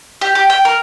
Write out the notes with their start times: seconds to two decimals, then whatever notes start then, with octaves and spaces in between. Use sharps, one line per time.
0.21 G4
0.35 G4
0.50 G5
0.65 A#4